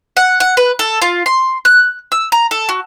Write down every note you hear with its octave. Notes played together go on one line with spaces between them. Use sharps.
F#5
F#5
B4
A4
F4
C6
F#6
E6
A#5
A4
F#4